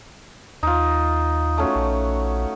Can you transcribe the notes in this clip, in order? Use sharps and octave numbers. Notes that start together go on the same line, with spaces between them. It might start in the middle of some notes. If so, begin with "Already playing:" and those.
D#2 D#4 F4
A3 C#4 F#4
A#1